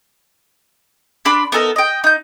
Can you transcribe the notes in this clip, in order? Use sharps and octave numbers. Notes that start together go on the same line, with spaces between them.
D4 D5 B5 C6
B3 D#4 A4 A#4
D#5 G5
D#4 G6